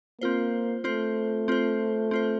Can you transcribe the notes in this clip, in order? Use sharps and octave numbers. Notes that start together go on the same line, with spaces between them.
A#3 C4 F4 C5
A3 C4 F4 C5
C4 F4 C5
C4 F4 C5